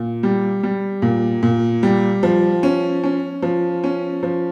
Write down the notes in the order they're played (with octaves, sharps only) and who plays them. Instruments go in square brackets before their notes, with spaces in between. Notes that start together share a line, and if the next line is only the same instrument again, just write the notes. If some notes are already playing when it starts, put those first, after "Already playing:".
Already playing: [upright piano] A#2
G3
G3
A#2
A#2
G3
F3
C#4
C#4
F3
C#4
F3